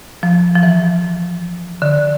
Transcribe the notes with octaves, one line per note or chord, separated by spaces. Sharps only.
F3
F3
E3
D3